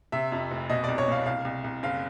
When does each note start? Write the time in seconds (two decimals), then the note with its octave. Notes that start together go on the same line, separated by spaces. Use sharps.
0.12 C3 E5
0.32 F2
0.51 F1
0.70 B2 D#5
0.84 C2 D5
0.98 C#5
1.08 B2 F5
1.26 C2 F5
1.45 C2
1.64 C2
1.83 F#1 F5